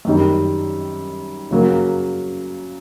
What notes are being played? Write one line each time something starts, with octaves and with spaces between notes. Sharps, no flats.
F#2 D#3 G3
C#3 F#3 A#3